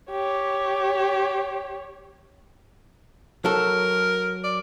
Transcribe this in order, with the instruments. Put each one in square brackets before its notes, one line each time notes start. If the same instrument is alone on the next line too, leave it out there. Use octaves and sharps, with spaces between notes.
[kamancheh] G4 C#5
[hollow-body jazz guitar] F#3 A4 [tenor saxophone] A#4
[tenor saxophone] D5